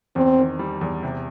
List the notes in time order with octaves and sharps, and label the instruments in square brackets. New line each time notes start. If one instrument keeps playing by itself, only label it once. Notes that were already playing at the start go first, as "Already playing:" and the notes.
[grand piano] E2 [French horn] C4
[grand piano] D#3
G3
E2
C3